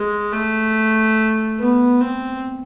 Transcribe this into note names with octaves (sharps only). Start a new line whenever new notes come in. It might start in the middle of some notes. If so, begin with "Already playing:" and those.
Already playing: G#3
A3
B3
C4